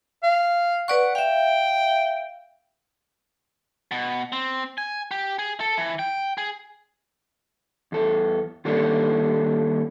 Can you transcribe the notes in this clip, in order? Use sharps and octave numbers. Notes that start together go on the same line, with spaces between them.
F5
B4 D5 F#5 C#6
E5 F5 G5
B2
C4
G#5
G4
G#4
A4
E3
G5
G#4
E2 A4
D#3 G3 A#3 C#4 D4 A4